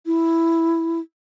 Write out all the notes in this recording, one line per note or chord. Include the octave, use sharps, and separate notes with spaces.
E4